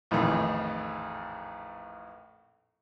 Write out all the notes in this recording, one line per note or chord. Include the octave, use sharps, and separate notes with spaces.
A#1 F2 A2 D#3 E3